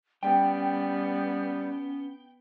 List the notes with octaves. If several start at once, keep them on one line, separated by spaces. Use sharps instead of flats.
G3 B3 C#4 G5